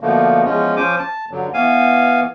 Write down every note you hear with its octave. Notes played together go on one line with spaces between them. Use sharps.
B2 D3 F3 A3 A#3
E2 F3 G#3 C#4
F3 C#4 C5 G#5 D6
A5
G2 D3 F#3
E3 B3 F5 G#5